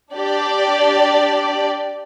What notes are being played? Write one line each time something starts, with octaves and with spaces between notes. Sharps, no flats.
D4 G4 D5